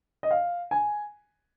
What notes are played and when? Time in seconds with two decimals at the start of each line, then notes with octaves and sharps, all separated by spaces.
0.23 D#5
0.31 F5
0.71 G#5